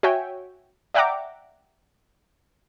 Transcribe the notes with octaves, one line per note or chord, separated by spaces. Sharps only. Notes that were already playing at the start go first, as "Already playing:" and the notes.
F#4 C#5 E5 G5 G#5
D5 E5 F#5 G5 A#5 D6